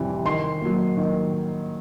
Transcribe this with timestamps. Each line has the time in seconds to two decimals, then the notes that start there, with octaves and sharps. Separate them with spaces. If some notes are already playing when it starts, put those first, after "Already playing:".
Already playing: F2 C3 E3 G3
0.25 D#3 C6
0.62 F#3 A#3
0.97 D#3